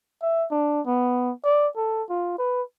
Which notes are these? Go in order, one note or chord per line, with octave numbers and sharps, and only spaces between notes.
E5
D4
B3
D5
A4
F4
B4